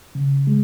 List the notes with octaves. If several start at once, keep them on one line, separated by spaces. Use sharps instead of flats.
C#3
G#3